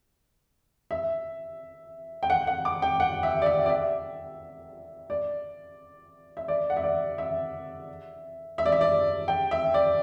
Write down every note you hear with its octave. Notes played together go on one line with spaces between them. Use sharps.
E5
G5
F#5
F#5
D6
G5
F#5
E5
D5
E5
D5
E5
D5
E5
D5
F#5
E5
D5
E5
E5
D5
E5
D5
G5
E5
D5